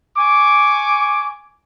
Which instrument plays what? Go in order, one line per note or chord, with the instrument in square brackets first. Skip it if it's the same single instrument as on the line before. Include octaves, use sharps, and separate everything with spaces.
[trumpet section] G#5 C#6 D6